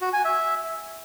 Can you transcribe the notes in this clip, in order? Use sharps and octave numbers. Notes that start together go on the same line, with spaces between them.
F#4
G#5
E5